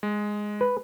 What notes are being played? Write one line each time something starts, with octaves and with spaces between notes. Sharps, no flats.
G#3
B4